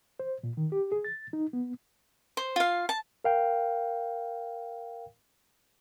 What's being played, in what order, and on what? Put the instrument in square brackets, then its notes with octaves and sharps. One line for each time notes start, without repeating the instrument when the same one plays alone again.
[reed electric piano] C5
A#2
D#3
G4
G#4
A6
D#4
B3
[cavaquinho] C5
F4 F5
A5
[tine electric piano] A#4 F5 G5